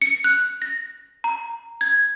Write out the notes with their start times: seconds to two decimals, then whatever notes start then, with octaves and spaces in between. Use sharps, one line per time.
0.02 C#7
0.24 F#6
0.62 A#6
1.24 A#5
1.81 G#6